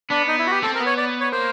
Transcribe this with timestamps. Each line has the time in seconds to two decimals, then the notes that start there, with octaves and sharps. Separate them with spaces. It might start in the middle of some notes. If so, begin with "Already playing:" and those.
0.10 B3 D4
0.28 D#4
0.39 E4
0.46 F#4
0.51 G4
0.62 C4 A4
0.75 A#4
0.80 B3
0.86 C#5
0.97 D5
1.21 C#5
1.32 A#3 C5